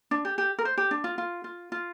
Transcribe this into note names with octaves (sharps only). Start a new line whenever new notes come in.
D4
G4
G4
A#4
C5
G4
D4
F4
F4
F4
F4